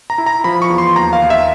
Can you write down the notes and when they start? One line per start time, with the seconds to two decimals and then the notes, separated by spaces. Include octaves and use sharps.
0.10 A#5
0.18 E4
0.26 A#5
0.44 F3 B5
0.62 C#6
0.70 E2
0.78 C6
0.96 D#2 A#5
1.13 F5
1.22 D#2
1.30 E5